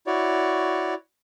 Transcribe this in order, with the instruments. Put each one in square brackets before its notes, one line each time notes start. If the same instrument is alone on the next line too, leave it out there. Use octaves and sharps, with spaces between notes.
[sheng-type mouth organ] E4 F#4 C#5 D5